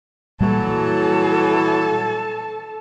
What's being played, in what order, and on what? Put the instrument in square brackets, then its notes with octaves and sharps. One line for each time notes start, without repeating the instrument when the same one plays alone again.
[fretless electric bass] A#2 G3 [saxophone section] E3 F#3 [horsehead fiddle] A4 A5